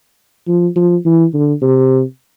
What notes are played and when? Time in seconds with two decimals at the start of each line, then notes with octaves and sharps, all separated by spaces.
0.48 F3
0.76 F3
1.05 E3
1.34 D3
1.62 C3